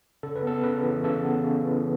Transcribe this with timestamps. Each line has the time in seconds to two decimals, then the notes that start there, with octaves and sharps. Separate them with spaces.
0.23 C#3 A4
0.36 B4
0.43 B3 A4
0.63 C#3 B4
0.84 E3
1.04 C#3 A4
1.24 B3
1.44 C#3
1.64 E3